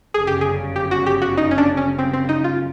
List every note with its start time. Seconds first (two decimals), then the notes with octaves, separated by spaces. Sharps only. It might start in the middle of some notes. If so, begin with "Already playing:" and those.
0.14 G1 F#2 C#3 G#4
0.27 G4
0.41 G#4
0.76 G4
0.91 F#4
1.06 G4
1.22 F#4
1.38 D#4
1.51 C#4
1.58 D4
1.77 C#4
1.99 C4
2.13 C4
2.29 D#4
2.44 F4